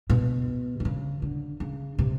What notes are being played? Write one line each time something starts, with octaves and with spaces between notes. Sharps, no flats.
B2
D3
C#3
D3
C#3
C3